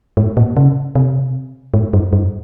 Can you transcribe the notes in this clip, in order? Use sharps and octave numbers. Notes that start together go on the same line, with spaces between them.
G#2
A#2
C#3
C3
G#2
G2
G2